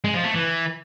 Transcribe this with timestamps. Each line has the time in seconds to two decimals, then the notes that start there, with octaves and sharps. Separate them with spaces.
0.04 G#3
0.14 F3
0.24 A3
0.34 E3